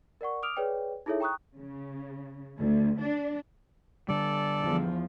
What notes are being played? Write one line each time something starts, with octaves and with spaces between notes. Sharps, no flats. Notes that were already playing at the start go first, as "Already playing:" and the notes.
A#4 D5 F#5 C#6
D6 D#6 F6 D7 F7
G#4 B4 C#5 D5 G5
D#4 E4 G#4 A4 C#5 E5
G5 A#5 C#6 D#6 F#6
C#3
D2
D4
D3 G3 A4 D5
E2 F3